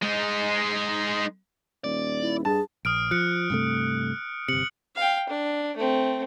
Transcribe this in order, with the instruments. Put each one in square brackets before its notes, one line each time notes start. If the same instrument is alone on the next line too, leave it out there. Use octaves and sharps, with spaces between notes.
[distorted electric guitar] G#3 D#4
[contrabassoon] D#1 [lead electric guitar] D5
[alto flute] E4
[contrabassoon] G2 [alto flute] G#4 [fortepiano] A5
[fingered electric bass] A#1 [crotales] D#6 F6 D7
[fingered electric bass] F3 [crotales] F#6 C#7
[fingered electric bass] G2 C3 A3
[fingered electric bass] G1 C3 [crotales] C#7 F#7
[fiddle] F5 G5
D4
A3 C4